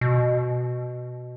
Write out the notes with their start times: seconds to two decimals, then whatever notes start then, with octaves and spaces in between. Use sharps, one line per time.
0.01 B2